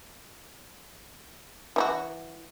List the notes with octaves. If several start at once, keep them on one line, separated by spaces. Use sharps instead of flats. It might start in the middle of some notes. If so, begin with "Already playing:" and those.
E3 D#4 F#4